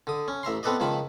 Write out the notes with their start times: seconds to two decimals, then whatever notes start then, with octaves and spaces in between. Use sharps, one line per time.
0.07 D3 D#6
0.28 C#4
0.43 A1 E5 A#5 C6
0.63 B3 C4 A4 B4 D5 D#5
0.80 C#2 D#3 F3 A5 B5